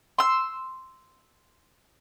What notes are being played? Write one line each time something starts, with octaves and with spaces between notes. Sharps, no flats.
C6 E6